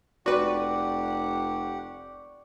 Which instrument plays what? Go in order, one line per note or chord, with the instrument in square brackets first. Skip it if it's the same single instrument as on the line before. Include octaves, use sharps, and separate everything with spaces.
[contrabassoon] F1 [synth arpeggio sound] F#4 B4 [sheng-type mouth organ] G4 F#5 [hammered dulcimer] D5 C#6